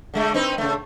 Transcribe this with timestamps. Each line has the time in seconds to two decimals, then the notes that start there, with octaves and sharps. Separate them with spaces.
0.14 D3 G#3 A3
0.34 C4 D#4 B4
0.58 C#3 A3